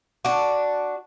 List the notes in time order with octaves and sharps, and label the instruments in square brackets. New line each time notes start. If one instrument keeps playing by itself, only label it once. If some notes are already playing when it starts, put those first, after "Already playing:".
[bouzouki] D4 F#4